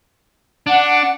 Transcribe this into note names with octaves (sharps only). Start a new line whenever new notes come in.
D4 F#5